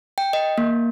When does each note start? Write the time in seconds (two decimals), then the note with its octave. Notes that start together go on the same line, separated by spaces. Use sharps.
0.18 G5
0.33 D#5
0.58 A#3